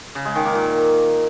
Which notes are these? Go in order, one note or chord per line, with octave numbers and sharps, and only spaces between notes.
C#3
G#3
D#3
A#3
A#2